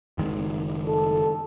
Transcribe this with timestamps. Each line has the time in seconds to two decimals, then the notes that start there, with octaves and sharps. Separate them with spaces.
0.18 F#1 D#3 G#3
0.87 A4